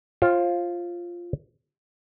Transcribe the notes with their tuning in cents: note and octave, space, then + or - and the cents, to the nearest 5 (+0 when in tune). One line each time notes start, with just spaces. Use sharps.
F4 -5 C5 +35 G5 +0